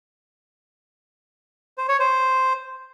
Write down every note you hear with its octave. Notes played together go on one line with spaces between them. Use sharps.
C5
C#5
C5